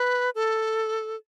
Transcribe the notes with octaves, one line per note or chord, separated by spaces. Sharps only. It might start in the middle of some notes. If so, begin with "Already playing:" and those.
Already playing: B4
A4